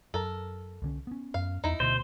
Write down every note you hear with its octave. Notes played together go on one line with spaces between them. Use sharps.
F#2 A4 A#4
C2 D3 C#4
B3 C#4
F#2 F5
E2 D#4 E4
D2 B2 C5